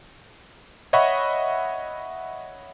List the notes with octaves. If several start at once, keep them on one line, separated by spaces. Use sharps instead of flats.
C#5 D#5 E5 F#5 B5 C#6